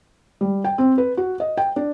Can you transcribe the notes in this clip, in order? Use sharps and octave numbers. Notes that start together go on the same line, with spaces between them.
G3
G5
C4
B4
F#4
D#5
G5
D4